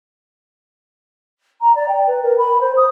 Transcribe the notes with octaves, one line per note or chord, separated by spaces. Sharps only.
A#5
D5
G5
B4
A#4
B5
C5
D#6